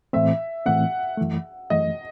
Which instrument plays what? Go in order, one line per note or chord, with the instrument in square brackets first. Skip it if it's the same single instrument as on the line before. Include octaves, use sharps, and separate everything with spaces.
[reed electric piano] A2 E3 A3 C4 [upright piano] E5
[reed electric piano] A2 E3 A3 C4 [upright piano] F#5
[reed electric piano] F#2 E3 A3
[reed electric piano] F#2 E3 A3 [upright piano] D#5